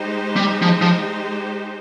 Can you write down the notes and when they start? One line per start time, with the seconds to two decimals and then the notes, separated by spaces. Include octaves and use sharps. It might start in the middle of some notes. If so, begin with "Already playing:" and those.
Already playing: G#3 D#4 G4 C5
0.36 G3
0.62 F3
0.82 F3